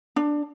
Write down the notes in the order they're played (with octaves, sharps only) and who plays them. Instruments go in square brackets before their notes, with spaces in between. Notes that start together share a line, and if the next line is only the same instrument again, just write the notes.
[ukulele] D4